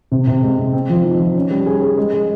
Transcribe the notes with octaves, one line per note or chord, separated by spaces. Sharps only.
C3
C3
G#3
C3
C4
F3
D#4
F3
C#4
G3
G#4
G#4
G#3
G#3